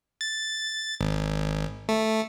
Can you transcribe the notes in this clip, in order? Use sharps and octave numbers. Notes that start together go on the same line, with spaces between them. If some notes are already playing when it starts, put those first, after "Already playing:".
A6
G#1
A3